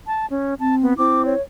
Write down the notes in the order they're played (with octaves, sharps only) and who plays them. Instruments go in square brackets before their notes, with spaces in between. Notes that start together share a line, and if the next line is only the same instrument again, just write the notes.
[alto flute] A5
C#4
[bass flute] C4 [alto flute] A5
[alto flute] B3
[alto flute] C4 [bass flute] E4 [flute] D6
[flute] C#5